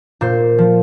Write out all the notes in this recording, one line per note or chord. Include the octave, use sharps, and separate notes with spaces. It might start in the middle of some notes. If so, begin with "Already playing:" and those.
A#2 C5
F3